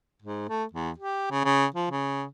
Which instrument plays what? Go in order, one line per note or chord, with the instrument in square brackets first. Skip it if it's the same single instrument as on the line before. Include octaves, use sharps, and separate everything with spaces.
[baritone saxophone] G#2
A3
E2
G4
C#3
C#3
F3
C#3